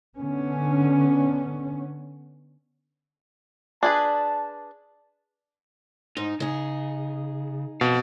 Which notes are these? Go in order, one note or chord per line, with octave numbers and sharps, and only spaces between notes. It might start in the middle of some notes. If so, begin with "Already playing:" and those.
D3 B3 C#4
D4 G#4 B4 A5
G#2 D#4
C#3 D#4 G#4
B2 C4 F5